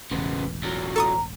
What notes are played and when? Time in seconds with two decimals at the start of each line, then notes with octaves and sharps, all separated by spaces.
0.11 E1 A1 C#3 B3
0.63 E2 F#3
0.96 A4 A#5 C#6 D#6